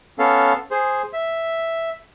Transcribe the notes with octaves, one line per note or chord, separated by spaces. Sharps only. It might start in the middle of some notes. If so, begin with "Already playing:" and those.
B3 C#4 A4 F5
G#4 C5
E5